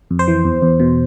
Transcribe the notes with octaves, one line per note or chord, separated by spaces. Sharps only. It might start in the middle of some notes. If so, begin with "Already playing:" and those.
F2
C5
E3
E2
E2
B2